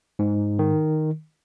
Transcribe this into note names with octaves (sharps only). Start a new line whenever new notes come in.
G#2
D#3